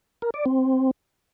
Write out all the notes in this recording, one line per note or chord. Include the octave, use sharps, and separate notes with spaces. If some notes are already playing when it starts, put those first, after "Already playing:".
A#4
D5
C4